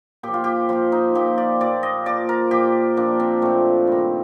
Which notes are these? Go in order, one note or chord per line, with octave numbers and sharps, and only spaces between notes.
A#2 F3 G4
F4
G4
A#2 F3 F4
D#4
A#2 F3 G4
D5
A#2 F3 D5
D#5
A#2 F3 D5
A#4
A#2 F3 G4
A#2 F3 D4
C4
A#2 F3 A3
G2 D#3